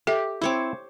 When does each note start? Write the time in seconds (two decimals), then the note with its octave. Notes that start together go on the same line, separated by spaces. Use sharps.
0.07 G4 A4 E5
0.42 C4 E4 C5 C#5 D6